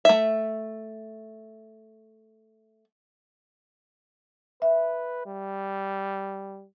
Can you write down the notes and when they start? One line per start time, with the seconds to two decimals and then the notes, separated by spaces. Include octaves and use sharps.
0.05 A3 E5
4.62 B4 E5
5.26 G3